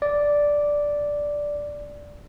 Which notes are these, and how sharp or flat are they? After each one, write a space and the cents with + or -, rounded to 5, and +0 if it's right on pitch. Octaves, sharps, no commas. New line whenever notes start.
D5 -5